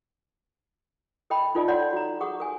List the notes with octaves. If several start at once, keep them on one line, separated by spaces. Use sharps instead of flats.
A4 D#5 G5 B5
D#4 F4 A4 D5 D#5
C#5 D5 F#5 C6
F#4 A#5
G#4 F#5 C#6 D#6
A4 G#5